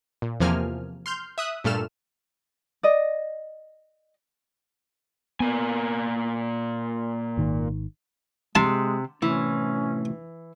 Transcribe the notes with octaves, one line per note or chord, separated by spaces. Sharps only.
A#2
E2 C3 F3 A#3 G#5 F6
C6 F6 G6
E5 D#6 F#6
G2 A#2 A3 A4 F6 E7
D5 D#5
A#2 A#3 B3 G#5
G#1 D#3
C3 G#3 A5
A2 C3 E3 C#4